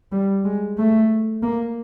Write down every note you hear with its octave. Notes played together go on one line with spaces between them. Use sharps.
G3
G#3
A3
A#3